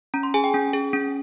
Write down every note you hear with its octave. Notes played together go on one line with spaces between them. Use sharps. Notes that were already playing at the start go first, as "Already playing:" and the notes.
C#4 A#5
C6
G#4 G#5
G5
C#4
G#4
C#4